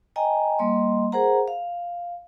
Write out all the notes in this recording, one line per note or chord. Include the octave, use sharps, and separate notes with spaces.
D#5 G5 G#5 A#5
G3 A#3 D#5 C6
G#4 A#4 C5 F#5 A#5
F5